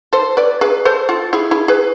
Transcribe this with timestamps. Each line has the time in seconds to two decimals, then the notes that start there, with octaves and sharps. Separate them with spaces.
0.13 A4 C5
0.37 B4 D5
0.61 G#4 B4
0.85 A4 C5
1.09 F4 A4
1.33 E4 G#4
1.51 E4 G#4
1.68 G#4 B4